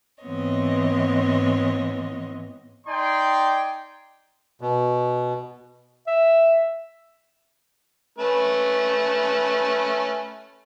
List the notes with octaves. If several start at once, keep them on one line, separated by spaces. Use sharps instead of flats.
G#2 E3 B3 C4 C#5 D#5
D#4 D5 G5 G#5 C6
B2
E5
A3 C#4 B4